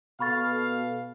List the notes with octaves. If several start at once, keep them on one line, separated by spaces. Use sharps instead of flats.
B2 A4 F5 B5 C#6 A6